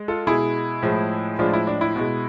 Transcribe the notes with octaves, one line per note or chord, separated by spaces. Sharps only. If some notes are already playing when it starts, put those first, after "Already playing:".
Already playing: G#3
F4 A4
B2 G#3 E4 G#4
A2 F3 G#3
A2 F3 G#3 D4 F4
E4
D4
E4
B2 G#3